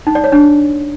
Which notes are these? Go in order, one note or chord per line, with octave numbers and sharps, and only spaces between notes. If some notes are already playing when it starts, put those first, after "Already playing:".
D#4
D5
C#5
D4